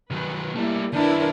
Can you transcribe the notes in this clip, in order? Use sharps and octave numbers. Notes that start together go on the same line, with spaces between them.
D#3 F#3 B4
G3 A3 A#3 E4
D#3 B3 D4 E4 A#4